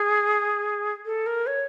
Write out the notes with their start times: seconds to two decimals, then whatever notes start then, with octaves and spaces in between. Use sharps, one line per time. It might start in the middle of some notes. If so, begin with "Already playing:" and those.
Already playing: G#4
1.05 A4
1.26 A#4
1.47 C#5